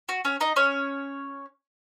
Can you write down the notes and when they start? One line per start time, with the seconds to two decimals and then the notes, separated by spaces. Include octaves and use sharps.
0.09 F#4
0.25 C#4 C#5
0.41 D#4 D#5
0.56 C#4 C#5